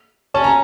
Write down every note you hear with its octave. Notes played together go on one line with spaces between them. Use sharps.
C#4 A5
A#5